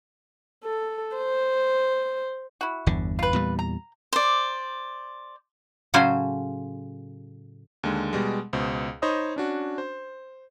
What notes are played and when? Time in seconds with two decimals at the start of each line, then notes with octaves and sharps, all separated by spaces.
0.64 A4
1.16 C5
2.61 E4 F#4
2.87 G1 E2 D3
3.19 F4 B4
3.33 E2 A#2 G3
3.59 A#5
4.13 C5 D5
5.94 A2 C#3 F#3 C#4 C5 G#5
7.83 D#2 D3 G#3
8.13 B2 G3 G#3
8.53 C#2 B2 C5
9.02 D#4 C5 C#5 D#5 B5 D#6
9.36 C#4 D4 F#4
9.78 C5